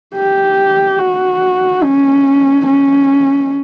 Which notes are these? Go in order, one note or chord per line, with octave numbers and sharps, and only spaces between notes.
G4
F#4
C#4
C#4